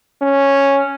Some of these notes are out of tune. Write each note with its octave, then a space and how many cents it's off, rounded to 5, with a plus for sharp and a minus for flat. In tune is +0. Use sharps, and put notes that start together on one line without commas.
C#4 -5